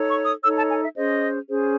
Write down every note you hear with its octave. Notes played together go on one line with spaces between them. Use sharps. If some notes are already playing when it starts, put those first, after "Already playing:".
Already playing: D#4 A4 C#5
C#6
D#6
D#4 A4 C#5 E6
A5
G#5
E5
C#4 G#4 C5 D#5
C#4 G#4 C5